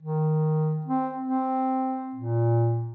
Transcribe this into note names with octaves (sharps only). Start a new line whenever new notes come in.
D#3
C4
C4
A#2